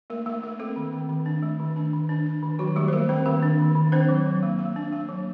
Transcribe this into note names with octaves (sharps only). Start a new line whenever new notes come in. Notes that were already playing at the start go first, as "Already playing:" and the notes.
A3 A#3 A#4
A3 A#3 A#4
A3 A#3 A#4
A3 C4 A4
D#3
C4
D#3
D4
A3
D#3
D4
D#3
D4
D4
D#3
D#3 F#3 F#4
G3 A3 G4
C5
A3 A#3 A#4
D#3 C4 C5
D#3 A#3 A#4
D4
D#3
D#3
C4 D4 C5
F#3
F#3
A#3
A#3
D4
A#3
F#3